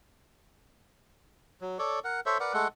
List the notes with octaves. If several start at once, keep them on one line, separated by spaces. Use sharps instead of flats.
F#3
A4 C#5 D5
A#4 F#5
A4 C5 C#5 E5
A#4 B4 D5 F#5
G#3 A3 A4 F#5